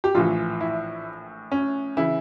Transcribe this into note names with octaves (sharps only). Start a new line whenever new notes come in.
G4
A#1 A2 E3 F4
E4
C#4
C#3 E3 E4